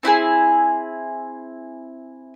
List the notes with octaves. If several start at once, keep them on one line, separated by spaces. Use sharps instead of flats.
C4 E4 F#4 G#4